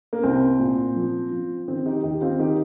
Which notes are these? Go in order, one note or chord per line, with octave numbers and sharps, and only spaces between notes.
A#3
C2 C4
A#2
F3
F3
D#3 C4
D#4 G4
D#2 D#4 G4
C4 F4
D#3 D#4 G4